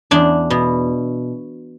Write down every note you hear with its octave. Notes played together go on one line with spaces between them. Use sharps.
E2 D4
B2